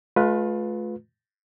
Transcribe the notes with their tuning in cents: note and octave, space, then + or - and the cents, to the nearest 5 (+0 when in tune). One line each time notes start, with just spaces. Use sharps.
A3 -40 F4 +25 B4 +0